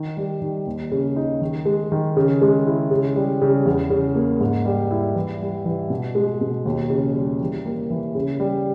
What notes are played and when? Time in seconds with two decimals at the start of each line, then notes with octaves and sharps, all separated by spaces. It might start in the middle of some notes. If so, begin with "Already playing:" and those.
Already playing: D#3
0.17 G3
0.42 D#3
0.67 D#2
0.92 C#3
1.16 D#4
1.42 D#3
1.65 G#3
1.92 D#3
2.17 C#3
2.41 G#3
2.67 E4
2.91 C#3
3.16 G3
3.41 C#3
3.65 E2
3.90 C#3
4.15 A#3
4.41 G#2
4.65 G3
4.91 E4
5.15 E3
5.41 G3
5.66 E3
5.90 B2
6.15 G#3
6.41 B2
6.66 D#2
6.90 C#3
7.15 G3
7.41 E3
7.65 A#3
7.90 E3
8.15 C#3
8.40 G3